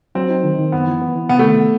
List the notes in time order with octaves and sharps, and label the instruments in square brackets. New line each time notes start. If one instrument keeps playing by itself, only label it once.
[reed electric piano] F#3 [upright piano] C4
[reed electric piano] D#4
D#3
D#3
[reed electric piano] F#2 [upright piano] B3
[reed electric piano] E3
B3
E3
[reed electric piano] C3 [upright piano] B3
[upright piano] A3
[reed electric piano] D#3